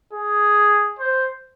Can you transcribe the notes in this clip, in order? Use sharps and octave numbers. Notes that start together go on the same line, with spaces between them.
G#4
C5